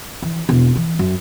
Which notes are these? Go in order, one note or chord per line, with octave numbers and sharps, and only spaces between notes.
E3
E1
E3
F#2